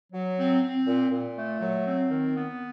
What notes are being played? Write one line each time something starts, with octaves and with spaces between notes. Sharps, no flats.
F#3
C4
C4
A#2
A#2
A3
F#3
C4
D#3
B3